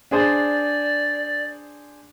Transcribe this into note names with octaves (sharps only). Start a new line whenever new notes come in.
D4 G#4 C5 D5